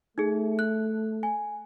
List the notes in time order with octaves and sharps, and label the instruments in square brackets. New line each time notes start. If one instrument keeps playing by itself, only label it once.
[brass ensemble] A3 [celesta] D#4 G#4
[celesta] F#6
G#5